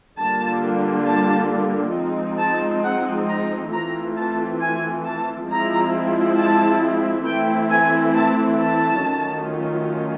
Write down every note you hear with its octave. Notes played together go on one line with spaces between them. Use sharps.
D3 G3 A#3 D4 F4 A5
A5
F3 G#3 C4 D#4
A5
F#5
A#5
E3 A3 C4 F4 A#5
A5
G#5
A5
F3 G#3 C4 E4 A#5
A5
E3 A3 C4 E4 G5
G#5
A5
A5
D#3 F#3 A3 C#4 F4